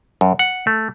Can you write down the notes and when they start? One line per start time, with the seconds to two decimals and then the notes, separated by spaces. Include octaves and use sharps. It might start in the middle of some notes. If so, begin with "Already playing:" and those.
0.21 F#2
0.39 F#5
0.67 A3